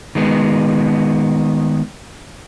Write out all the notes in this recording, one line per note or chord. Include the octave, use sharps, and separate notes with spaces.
D#3 G#3 B3